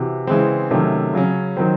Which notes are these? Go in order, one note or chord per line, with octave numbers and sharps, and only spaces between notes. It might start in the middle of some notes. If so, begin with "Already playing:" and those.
Already playing: C3 E3 F#4
C#3 E3 G#3 C4
C3 D#3 F#3 A3 C#4
C#3 F#3 C#4
D#3 F#3 C4